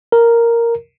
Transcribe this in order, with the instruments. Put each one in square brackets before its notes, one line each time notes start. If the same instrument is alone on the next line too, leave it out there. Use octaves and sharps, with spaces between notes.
[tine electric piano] A#4